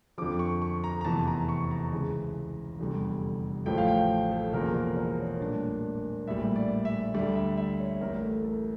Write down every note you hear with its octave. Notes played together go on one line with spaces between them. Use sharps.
F2 D3 F3 D6
C#6
C#6
A#5
A#5
F1 E2 E3 A5
A#5
C#6
A#5
C#2 C#3 E3
F1 E2 D3 G3
A1 A2 F3 A3 G5
F5
G5
A4
E1 E2 C#3 F3 A#3 A#4
A#4
A#4
C#5
A#1 A2 G3 D4
A#1 A2 G3 E5
D5
E5
D2 D3 G3 D5
E5
E5
C#5
A1 A2 E3 A#4
A4
A4